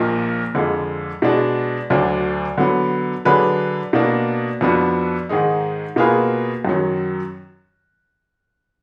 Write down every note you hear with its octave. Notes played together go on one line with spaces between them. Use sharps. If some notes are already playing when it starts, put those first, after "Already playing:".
Already playing: A#1 A#2 F3 A#3 D#4
F2 D3 F3 G#3
B2 G#3 D4 F#4
D2 D3 F#3 D4
D3 F#3 B3
D3 F#3 D4 G#4 B4
B2 A#3 D4
F2 F3 B3 D4 F#4
G#2 D#3 G#3 D#4
B2 A#3 F4 G#4 B4
F#2 D#3 F#3